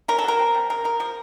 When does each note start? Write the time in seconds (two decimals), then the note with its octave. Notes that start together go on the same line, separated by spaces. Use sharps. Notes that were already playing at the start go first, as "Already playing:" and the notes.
0.08 C#4 A#4
0.18 A4
0.24 F#3 A#4
0.39 C4
0.55 G3
0.70 C#3 A#4
0.84 C#3 A#4
1.00 F3 A#4